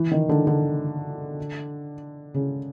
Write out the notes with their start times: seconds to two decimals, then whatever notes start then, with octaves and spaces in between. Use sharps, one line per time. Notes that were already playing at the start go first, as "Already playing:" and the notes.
Already playing: E3
0.11 D#3
0.29 D3
0.47 D3
2.34 C#3